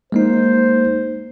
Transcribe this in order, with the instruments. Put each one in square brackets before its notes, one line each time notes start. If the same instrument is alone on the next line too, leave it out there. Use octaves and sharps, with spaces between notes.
[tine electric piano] G#3 A#3 D#4 [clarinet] C5